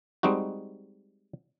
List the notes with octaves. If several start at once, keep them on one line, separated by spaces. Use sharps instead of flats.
G3 G#3 C4 D#4 F#4